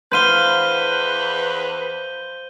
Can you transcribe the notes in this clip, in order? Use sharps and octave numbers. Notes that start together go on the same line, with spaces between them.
E2 B4 C5 F5 G6 D#7 G7